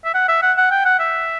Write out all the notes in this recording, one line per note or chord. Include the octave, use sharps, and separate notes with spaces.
E5
F#5
E5
F#5
F#5
G5
F#5
E5